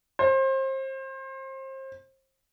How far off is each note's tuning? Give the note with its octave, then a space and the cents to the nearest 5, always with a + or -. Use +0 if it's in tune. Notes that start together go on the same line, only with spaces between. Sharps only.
C5 +30